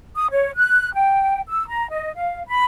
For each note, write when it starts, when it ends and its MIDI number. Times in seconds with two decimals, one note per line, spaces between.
0.16 0.27 87
0.31 0.50 73
0.55 0.92 90
0.93 1.40 79
1.48 1.66 88
1.67 1.90 82
1.90 2.12 75
2.15 2.42 77
2.47 2.64 83